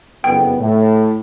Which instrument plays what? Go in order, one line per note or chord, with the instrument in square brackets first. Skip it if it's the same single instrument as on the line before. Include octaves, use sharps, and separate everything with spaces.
[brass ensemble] F#1 F2 B3 [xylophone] G5
[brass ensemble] A2